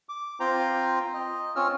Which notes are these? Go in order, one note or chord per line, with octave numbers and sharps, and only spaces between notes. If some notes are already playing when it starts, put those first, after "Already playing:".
D6
C4 F4 C5 G5 A#5
D#5
C4 C#4 F4 C#5 E6 F6